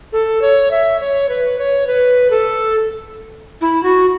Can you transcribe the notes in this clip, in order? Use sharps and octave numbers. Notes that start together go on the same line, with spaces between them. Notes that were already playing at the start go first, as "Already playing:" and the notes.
A4
C#5
E5
C#5
B4
C#5
B4
A4
E4
F#4